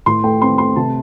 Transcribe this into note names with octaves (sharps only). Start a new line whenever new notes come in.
A2 C6
A3 G5
C4 C6
A3 C6
C3 A5